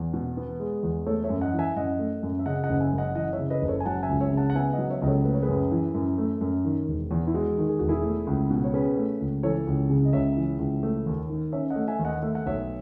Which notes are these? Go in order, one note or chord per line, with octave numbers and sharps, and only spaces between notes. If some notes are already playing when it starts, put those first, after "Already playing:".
Already playing: E2
B2
B3
G#3
E2
A3 A4 C#5
C#5 E5
F#2
D#5 F#5
E3
E5 G#5
F#2 D#5 F#5
A3
F#2
E5
C#3 D#5 F#5
D#5 F#5
F#1
E5 G#5
F#2
D#5 F#5
E3 D#5 F#5
C#5 E5
C#3
B4 D#5
F#1
A4 C#5
G#5
F#3 F#5 A5
E5 G#5
C#2
C#5 E5
C#3
F#5 A5
F#5
B3 E5 G#5
D#5 F#5
F#3
C#5 E5
C#2 D#5
A4 C#5
A3 B4
C#5
G#4 B4
F#2
E3
F#2
A3
F#2
D#3
E1
E2
E4
G#3 F#4
D#3
G#4
E1 F#4
E4 G#4
A3
C#2
B2
C#5
C#4 G#4 B4
A3
C#2
E3 A4 C#5
C#2
C#3
D#5
C#2 C#5 E5
E3
C#2
A3
D#2
D#3
C#4 C#5 E5
D#5 F#5
A3
E5 G#5
D#2
D#5 F#5
A3 E5
F#5
B1 C#5 E5